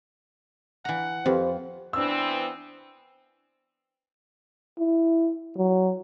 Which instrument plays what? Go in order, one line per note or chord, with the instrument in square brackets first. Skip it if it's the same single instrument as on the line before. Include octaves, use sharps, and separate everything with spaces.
[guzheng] E3 A#5 [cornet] F#5
[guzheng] F2 [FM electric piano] C4 G4 B4 [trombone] C5
[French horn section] E3 B3 C4 [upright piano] D4 E6
[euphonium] E4
F#3